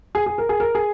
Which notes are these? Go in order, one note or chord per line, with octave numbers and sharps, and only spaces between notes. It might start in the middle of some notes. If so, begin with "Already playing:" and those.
G#4
G#4
A#4
G#4
A#4
G#4